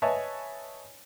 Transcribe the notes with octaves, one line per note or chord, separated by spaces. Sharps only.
B4 C#5 D#5 E5 G#5 A5